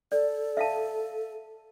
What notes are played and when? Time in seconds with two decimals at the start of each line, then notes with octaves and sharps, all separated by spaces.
0.12 A4 D5
0.57 E5 F5 A5